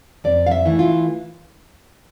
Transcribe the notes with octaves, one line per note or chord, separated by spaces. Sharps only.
F2 D5
F5
E5
E3 A3 E4
F4